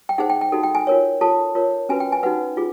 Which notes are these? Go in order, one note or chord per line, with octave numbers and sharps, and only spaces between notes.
G5
D#4 G#4 C5 F#5
G5
G5
D#4 F#4 A4
G5
G#5
F4 A#4 C#5
F4 A4 C#5 A5
F4 A#4 C#5
C#4 F#4 B4 G#5
G5
G#5
D#4 F#4 B4 F#5
F4 G#4